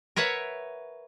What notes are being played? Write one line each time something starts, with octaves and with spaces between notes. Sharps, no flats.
A#4 B4 C#5 E5 F#5